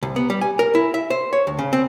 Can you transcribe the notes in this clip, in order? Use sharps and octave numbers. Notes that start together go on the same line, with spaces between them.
C2
B3
G3
G#5
A#4
E4
E5
C5
C#5
D2
C#3
C4